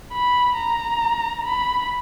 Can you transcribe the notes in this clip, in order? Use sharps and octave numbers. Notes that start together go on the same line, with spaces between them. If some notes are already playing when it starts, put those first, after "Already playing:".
B5
A#5
B5